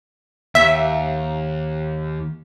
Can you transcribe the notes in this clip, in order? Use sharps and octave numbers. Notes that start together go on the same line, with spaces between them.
D#2 E5